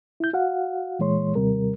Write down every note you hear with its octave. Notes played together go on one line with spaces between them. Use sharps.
E4 G6
F#4 F5 F#5
A#2 E3 G#3 C#5 C6
D#2 C3 G3 A#4